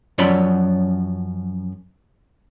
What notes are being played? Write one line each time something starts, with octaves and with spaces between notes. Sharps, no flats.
F#2 F3 F#3 C#5 D5 B5